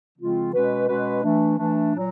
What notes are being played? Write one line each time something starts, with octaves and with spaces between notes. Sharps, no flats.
C#3 F3 G#3 C4 F4
B2 G#3 C#4 F#4 B4
B2 G#3 C#4 F#4 B4
E3 A3 D4
E3 A3 D4
A#2 F#3